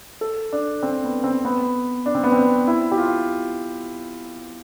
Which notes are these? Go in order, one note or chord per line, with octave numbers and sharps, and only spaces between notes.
A4
D4
C4
B3
C4
B3
D4
C4
B3
C4
E4
G4
F4